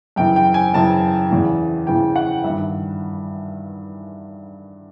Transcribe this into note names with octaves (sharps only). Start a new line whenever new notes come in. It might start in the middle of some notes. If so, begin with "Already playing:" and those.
F#2 C#3 E3 G5
G5
G#5
F#2 C#3 E3 A5
E2 C#3 E3
E2 C#3 E3 G5
F#5
G2 D#3 E5